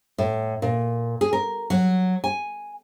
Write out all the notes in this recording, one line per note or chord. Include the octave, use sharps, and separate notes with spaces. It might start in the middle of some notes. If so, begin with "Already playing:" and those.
A2
A#2
G#4
A#4
F#3
G#5